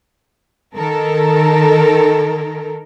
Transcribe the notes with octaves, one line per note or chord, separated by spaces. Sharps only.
D#3 A4 A#4